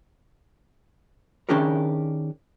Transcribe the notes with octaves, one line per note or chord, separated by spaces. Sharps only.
D#3 C#4 D4 G4 G#4 A#4